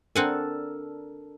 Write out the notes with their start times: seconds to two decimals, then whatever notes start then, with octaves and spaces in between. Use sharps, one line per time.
0.16 C4 D4 A4 A#4 F#5 G#5